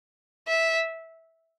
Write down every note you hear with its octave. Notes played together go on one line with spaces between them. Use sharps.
E5